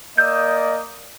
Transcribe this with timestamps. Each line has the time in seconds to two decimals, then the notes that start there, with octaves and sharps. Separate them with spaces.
0.18 A#3 D5 D#5 D#6 E6 G6